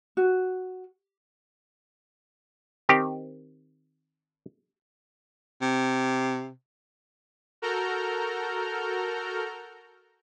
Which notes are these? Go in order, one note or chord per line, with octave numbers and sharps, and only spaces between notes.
F#4
D#3 C4 G4
C3
F#4 A4 A#4 A#5 F6 G6